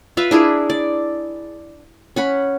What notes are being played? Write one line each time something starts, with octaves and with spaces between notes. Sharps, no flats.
F4 B4 E5 F5
D4 E4 G#4 A#4
D5
C#4 F#5 B5